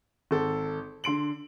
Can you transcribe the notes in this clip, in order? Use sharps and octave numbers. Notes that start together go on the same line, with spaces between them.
G#1 A4
D3 C6 D7 F#7